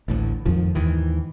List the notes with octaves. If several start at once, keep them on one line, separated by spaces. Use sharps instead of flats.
A1 D2 A2
F2 G#2 D#3 F3
D#2 G#2 D#3 E3